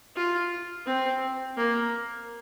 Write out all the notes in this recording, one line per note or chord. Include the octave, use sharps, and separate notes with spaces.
F4
C4
A#3